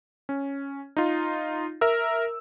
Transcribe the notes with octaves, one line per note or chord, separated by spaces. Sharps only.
C#4
D#4 F4
A#4 E5 E6